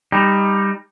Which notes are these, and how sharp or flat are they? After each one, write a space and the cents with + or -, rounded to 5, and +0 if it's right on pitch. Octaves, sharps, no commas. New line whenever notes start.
G3 +15 D#4 +0